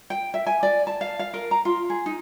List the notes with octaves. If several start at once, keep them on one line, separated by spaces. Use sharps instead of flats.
G5
E5
G#5
D5
A5
F5
F5
A#4
A#5
F4
G#4
D#4